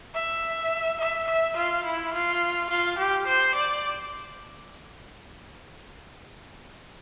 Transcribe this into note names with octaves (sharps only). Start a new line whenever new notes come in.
E5
E5
E5
F4
E4
F4
F4
G4
C5
D5